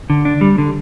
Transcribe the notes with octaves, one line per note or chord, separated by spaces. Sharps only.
D3
D4
G3
D3